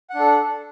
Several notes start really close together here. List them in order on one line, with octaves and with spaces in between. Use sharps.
F#5 D4 A4